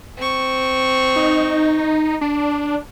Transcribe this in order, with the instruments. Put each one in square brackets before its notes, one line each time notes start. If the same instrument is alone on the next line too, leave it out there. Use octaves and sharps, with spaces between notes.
[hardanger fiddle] C4 C#6
[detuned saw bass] D#4
D4